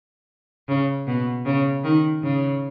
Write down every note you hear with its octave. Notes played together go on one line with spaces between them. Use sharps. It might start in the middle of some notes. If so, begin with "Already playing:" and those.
C#3
B2
C#3
D#3
C#3